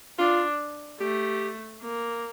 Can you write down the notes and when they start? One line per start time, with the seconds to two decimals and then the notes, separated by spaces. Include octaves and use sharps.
0.19 D4 F4
1.00 A3 G4
1.82 A#3